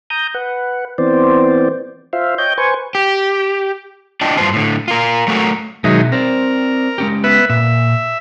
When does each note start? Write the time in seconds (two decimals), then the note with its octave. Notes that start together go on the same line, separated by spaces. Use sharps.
0.10 A#5 D#6 G6
0.34 B4 F#5
0.98 E3 B3 C4 C5 D5
2.13 F4 C5 E5 F5
2.38 C#5 D#5 G5 G6
2.58 B4 C5 G#5 C#6
2.95 G4
4.21 D4 F4 D5 D#5 G5 A5
4.37 G2 C#3 F4 B4 C5 A5
4.53 A2 D3
4.88 F4 A#4
5.27 F#3 A3 F#4 A#4
5.84 B2 D#3 F#3 G#3 E5
6.12 C4 A#4 C5 D5
6.98 G#3 C#4 G4
7.24 B3 B4 E5
7.49 A#2 E5